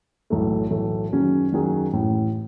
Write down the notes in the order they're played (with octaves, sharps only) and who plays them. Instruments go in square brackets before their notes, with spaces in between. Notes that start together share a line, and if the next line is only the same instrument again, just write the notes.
[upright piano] B1 A2 E3 A3
B1 A2 E3 A3
F#2 D#3 F#3 C#4 G#4
F#2 D#3 F#3 C#4 G#4
A1 A2 E3